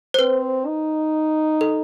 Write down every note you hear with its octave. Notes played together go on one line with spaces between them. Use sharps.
C5
C4 B4
D#4
A4